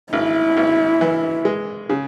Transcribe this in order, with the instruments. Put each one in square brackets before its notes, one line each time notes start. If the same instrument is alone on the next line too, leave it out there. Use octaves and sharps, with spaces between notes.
[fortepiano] G#1 [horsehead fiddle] E4
[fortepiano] G#1
E3
G#3
C#3